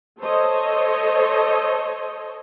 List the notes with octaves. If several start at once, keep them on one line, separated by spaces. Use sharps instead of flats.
A4 C5 C#5 D#5